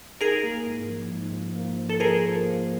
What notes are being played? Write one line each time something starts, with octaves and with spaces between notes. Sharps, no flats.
D#4 G#4 A#4
A#3
G#2
F3
G#2
F3
A#3
F3
A4
F3 G#4 A#4
F3
A#3